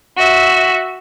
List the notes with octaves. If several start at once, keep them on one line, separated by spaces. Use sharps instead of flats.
F#4 E5